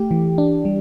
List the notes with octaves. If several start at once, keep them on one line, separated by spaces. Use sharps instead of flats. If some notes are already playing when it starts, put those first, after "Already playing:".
Already playing: A3 G4
E3
D4
G3